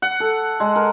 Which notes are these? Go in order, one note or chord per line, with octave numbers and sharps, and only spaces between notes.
F#5
A4
G#3
A#4